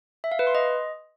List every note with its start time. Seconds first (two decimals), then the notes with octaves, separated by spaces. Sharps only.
0.24 E5
0.32 F5
0.39 B4
0.47 C6
0.55 D#5